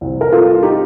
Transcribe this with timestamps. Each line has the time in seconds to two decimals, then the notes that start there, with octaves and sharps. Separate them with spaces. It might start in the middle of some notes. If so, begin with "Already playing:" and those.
0.01 C2 C3 G3 C4
0.21 A#4
0.32 F4 A4
0.63 D#4 G4